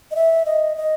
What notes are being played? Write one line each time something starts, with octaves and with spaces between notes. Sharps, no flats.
D#5
E5
D#5
D#5